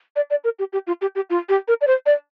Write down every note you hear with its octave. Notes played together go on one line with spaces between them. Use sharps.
D5
D5
A#4
G4
G4
F4
G4
G4
F4
G4
A#4
D5
C5
D5